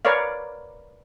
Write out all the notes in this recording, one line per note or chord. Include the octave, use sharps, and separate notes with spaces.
A#4 B4 C#5 D5 F5